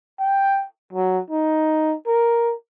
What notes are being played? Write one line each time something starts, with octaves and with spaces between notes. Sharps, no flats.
G5
F#3
D#4
A#4